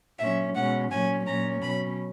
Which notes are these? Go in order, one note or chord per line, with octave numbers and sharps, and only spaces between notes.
A#2 F#3 C#4 E5
B2 G#3 C#4 F#5
A#2 F#3 C#4 G#5
A#2 F#3 C#4 A#5
B2 F#3 C#4 B5